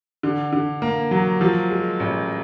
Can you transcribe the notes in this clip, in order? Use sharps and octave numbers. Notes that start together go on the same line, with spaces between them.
D3
D3
A#3
F#3
F3
G#3
A1